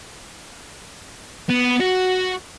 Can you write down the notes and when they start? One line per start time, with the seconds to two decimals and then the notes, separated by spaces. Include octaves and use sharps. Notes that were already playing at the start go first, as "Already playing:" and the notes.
1.49 B3
1.80 F#4